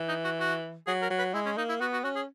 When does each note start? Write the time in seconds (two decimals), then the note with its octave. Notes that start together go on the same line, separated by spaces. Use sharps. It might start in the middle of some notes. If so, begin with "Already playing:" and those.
Already playing: E3
0.08 D#4
0.24 F#4
0.40 F#4
0.87 F#3 G#4
1.02 A#4
1.10 F#3
1.18 B4
1.34 G#3 E4
1.46 C#4
1.57 A#3 D#4
1.69 E4
1.81 B3 F#4
1.93 F#4
2.04 C#4 F#4
2.16 G#4